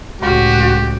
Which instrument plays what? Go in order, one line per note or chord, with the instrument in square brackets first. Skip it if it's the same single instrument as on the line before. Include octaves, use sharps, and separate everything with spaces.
[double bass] C#2 A2 [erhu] F#4 [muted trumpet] G4